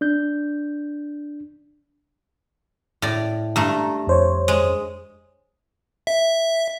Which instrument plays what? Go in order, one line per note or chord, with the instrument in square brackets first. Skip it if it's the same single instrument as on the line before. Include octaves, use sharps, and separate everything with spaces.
[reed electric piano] D4 G6
[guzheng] A2 D5
[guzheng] G2 A3 [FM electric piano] A#5
[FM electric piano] F2 C5 C#5
[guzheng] G#3
[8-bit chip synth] E5